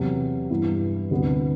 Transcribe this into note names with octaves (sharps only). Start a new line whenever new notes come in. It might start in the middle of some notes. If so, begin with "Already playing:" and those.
Already playing: E2 C3 F#3 B3
G2 E3 B3 E4
D2 C3 G3 B3 D4